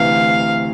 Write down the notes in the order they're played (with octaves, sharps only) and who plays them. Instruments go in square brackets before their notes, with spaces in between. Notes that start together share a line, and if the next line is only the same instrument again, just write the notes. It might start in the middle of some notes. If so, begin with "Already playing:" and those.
Already playing: [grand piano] D2 C3 E3 [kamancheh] F5